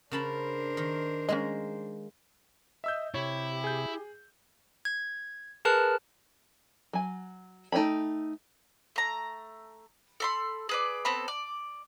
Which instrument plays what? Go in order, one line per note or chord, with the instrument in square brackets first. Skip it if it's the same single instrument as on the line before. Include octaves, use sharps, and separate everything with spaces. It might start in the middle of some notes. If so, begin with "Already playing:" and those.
[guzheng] C#3 A5 B5 [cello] D4 C5 [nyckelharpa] A#4
[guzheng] D#3
[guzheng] G#3 A#3 [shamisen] C#4 D#5
[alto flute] D#5 [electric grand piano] E5 E6 G6
[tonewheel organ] C3 [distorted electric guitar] E4 [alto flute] G4 [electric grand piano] C#5
[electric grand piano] G#4 G6
[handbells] G#6
G#4 A#4 B4 A5 F6 F#6
[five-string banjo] F#3 G#5
A3 D#4 C#5 G5 B5
[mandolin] A3 A#5
A4 B5 C6
G#4 B4 D5
B3 C4 A4 B5
D5